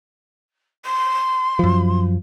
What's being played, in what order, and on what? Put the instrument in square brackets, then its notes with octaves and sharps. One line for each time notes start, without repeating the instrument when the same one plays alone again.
[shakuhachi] C6
[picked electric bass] F#2 F3